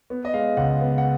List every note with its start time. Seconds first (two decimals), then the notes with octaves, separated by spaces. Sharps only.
0.10 B3
0.25 D#5
0.34 G#3 F5
0.57 C#2 F#5
0.81 B3
0.98 F#5